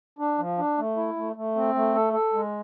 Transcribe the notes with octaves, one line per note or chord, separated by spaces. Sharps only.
D4
F3
D4
A3
E4
A3
A3
C4
A3
A4
A4
G#3